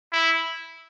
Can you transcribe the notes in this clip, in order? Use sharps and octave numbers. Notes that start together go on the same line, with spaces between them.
E4